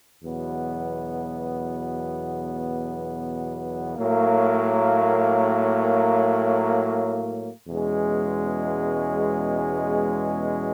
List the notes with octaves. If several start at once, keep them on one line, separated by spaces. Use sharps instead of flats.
E2 B2 F#3 B3
A2 F#3 A#3
E2 B2 G#3 C#4